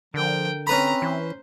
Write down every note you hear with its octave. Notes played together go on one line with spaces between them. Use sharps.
D3 F3 A#4 G5
C4 C#4 B4 A#5 B5
E3 C5